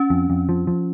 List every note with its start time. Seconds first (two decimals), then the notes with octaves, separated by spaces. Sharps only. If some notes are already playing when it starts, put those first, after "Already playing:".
Already playing: C#4
0.10 F2
0.30 F2
0.49 F3
0.67 F3